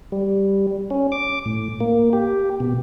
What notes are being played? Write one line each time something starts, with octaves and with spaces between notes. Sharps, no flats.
G3
C#4
D6
A2
A#3
G4
B2